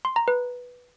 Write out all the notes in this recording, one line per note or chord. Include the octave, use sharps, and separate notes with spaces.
C6
A#5
B4